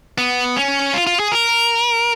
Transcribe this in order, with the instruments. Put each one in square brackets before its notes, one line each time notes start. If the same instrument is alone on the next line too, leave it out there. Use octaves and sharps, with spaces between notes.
[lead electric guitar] B3
C#4
F4
F4
G#4
A#4